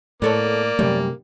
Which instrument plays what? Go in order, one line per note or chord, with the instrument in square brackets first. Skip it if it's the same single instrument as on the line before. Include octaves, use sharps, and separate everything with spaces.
[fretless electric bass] A2 [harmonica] A#3 [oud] B3 A4 C#5 [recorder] D5
[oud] F#2 G3 [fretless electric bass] C3 A3